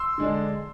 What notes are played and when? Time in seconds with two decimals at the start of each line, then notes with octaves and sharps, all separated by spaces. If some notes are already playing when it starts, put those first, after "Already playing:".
Already playing: C6 E6
0.18 D3 G#3 D4